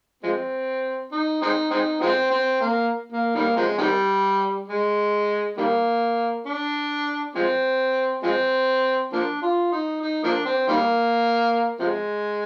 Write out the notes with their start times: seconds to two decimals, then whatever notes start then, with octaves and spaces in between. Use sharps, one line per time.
0.23 F3 G#3 C4
1.12 D#4
1.42 G#3 C4 D#4
1.71 G#3 C4 D#4
2.01 F3 G#3 C4
2.31 C4
2.61 A#3
3.12 A#3
3.35 D#3 G3 A#3
3.56 C3 F3 G#3
3.78 C3 D#3 G3
4.68 G#3
5.57 D#3 G3 A#3
6.46 D4
7.35 F3 G#3 C4
8.23 F3 G#3 C4
9.12 F3 A#3 D4
9.42 F4
9.72 D#4
10.01 D#4
10.24 F3 A#3 D4
10.45 C4
10.68 D#3 G3 A#3
11.79 C3 F3 G#3